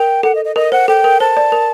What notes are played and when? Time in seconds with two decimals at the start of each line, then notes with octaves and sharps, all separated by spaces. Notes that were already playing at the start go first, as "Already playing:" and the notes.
Already playing: A#4 G5
0.23 A4 F#5
0.35 D#5
0.45 D#5
0.56 A#4 D#5
0.72 C5 F#5
0.88 A4 G5
1.04 A#4
1.20 C5 A5
1.37 D5
1.52 A#4